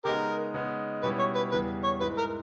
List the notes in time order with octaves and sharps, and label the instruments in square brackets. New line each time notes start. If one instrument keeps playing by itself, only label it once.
[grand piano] C#3 G#3 B3 D#4 [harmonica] G4 A#4
[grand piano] C#3 G#3 B3 D#4
[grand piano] B2 G3 C#4 E4 [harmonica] B4
[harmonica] C#5
B4
[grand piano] E2 C#3 E3 G3 [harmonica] B4
[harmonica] C#5
[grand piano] G#2 E3 G#3 [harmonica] B4
[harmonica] A#4